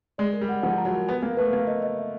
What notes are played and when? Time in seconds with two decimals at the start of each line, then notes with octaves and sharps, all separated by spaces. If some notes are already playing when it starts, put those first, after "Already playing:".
0.18 G#3 D5
0.33 A#4
0.41 G3
0.49 F#5
0.63 F3 F#5
0.78 A#5
0.85 F#3
0.93 A#4
1.07 B3 G#5
1.22 A#3 G#5
1.37 A3 B4
1.53 A#3 B4
1.67 D#5
1.82 D#5
1.98 E5